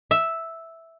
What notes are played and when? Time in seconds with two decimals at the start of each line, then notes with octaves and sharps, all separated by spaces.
0.11 E5